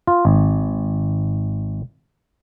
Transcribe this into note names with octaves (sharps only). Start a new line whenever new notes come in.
F4
G#1